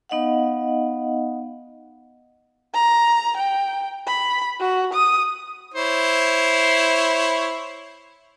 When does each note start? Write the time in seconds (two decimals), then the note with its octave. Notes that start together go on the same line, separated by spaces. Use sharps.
0.09 B3 D#4 D#5 F5 F#5
2.74 A#5
3.37 G5
4.07 B5
4.60 F#4
4.93 D#6
5.74 E4 C5 C#5